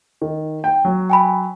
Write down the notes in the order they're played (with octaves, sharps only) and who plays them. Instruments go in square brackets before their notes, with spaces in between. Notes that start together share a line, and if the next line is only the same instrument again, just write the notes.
[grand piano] D#3
G5
F#3
[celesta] G5 G#5 B5